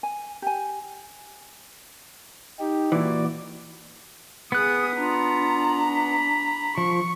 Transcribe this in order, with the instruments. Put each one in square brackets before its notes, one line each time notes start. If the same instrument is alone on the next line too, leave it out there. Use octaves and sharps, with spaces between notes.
[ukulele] G#5
G4 G#5
[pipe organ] D#4 G4
[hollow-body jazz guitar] A#2 E3 [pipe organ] F#4 D5
[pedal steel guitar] B3 F#6 [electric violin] G#4 D#6
[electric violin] D4 A#5 [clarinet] F4
[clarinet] B5
[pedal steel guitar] F3 [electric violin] C#6